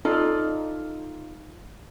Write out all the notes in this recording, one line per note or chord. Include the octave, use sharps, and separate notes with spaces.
D#4 F4 A4 D5